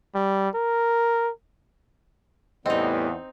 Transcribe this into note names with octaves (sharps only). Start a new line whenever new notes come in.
G3
A#4
E2 A2 G3 B3 C4 D#4 D#5